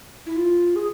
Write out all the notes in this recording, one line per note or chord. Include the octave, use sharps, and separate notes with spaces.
E4
F4
G#4